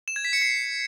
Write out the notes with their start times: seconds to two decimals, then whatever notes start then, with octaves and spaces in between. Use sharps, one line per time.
0.08 E7
0.16 G#6
0.25 B6
0.33 C#7
0.42 C7